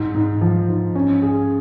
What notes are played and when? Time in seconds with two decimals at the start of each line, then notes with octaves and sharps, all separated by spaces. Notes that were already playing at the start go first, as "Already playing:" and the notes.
Already playing: G#2
0.14 G#2
0.41 F3
0.68 G#2
0.95 C#4
1.22 G#4